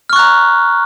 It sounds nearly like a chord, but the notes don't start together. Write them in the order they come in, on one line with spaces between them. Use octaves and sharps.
F6 C#6 F#6 A#5